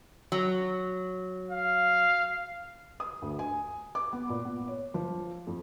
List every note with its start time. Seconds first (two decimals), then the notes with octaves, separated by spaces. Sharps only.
0.32 F#3
1.51 F5
3.00 D#6
3.22 D2
3.39 G#5
3.95 D6
4.13 B3
4.29 A#2
4.45 B3
4.68 C#5
4.94 F3
5.47 F2